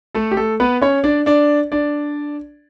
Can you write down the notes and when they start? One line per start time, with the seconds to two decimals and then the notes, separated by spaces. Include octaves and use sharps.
0.15 A3 A4
0.31 G4
0.37 A3 A4
0.60 B3 B4
0.82 C#4 C#5
1.04 D4 D5
1.26 D4 D5
1.72 D4 D5